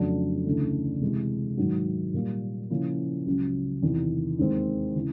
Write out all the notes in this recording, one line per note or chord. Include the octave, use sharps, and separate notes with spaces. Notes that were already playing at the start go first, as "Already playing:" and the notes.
Already playing: F2 C#3 F#3 A3 D4
D2 C#3 E3 A3
C3 E3 G#3
G#2 D#3 F#3
A#2 G3 A#3
C#3 F3 A#3 C#4 E4
C#2 C#3 F#3
E2 C3 D#3
D#2 D#3 G#3 C4
C#3 E3